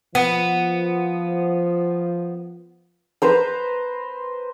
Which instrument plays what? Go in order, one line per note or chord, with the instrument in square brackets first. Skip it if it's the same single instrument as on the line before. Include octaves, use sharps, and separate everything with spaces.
[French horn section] F3 [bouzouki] B3
[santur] B4 C5 A#5